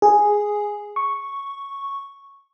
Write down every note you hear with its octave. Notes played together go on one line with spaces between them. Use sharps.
G#4
C#6